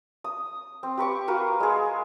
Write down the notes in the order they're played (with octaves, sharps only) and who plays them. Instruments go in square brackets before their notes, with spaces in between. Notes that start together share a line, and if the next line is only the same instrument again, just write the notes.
[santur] D#6
C4
G4 B4 C#6 D6
F4 F#4 A#4 B4
G#3 G#4